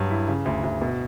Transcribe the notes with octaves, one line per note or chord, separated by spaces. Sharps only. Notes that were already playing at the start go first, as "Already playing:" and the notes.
Already playing: G2 F#3
E4
C#3
D2
D2
B2